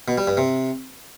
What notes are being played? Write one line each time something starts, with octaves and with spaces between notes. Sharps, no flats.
B2
G3
G2
C3